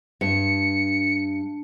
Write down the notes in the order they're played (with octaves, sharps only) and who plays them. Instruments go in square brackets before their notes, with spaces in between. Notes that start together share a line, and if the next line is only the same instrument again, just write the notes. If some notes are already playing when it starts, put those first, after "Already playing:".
[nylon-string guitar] G2 [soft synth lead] C#7